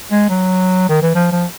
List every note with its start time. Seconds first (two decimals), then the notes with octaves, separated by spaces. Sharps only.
0.12 G#3
0.29 F#3
0.89 D#3
1.02 E3
1.15 F3
1.32 F3